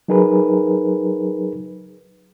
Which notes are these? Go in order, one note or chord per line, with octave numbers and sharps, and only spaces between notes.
F#3 D#4 G#4 A#4 B4